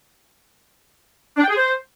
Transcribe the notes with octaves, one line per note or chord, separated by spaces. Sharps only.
D4
G5
G#4
C5